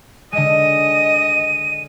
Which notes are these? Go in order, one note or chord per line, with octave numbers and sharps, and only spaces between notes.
D3 G#3 D#5 D#7